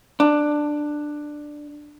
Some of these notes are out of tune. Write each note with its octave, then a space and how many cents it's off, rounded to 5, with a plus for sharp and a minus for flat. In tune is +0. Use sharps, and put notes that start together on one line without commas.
D4 +10